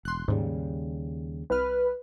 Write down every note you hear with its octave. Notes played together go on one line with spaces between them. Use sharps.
E1 C6 F#6
D#2 G#2 C#3 G3
C2 B4 F6